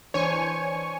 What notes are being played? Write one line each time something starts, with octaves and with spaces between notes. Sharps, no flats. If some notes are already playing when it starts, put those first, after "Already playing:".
E3 D4 C5 C#5 G#5 C#6